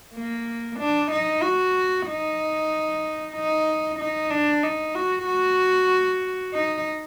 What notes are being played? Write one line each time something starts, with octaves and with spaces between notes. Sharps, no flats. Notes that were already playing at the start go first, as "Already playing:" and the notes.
A#3
D4
D#4
F#4
D#4
D#4
D#4
D4
D#4
F#4
F#4
D#4